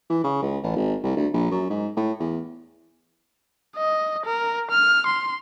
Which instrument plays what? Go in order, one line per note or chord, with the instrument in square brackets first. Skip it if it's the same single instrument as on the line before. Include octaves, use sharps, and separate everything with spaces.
[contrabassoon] E3
C#3
C#2
A1
G#1
C2
D2
A#1
F#2
G#2
A2
E2
[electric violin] D#5
A#4
F6
C6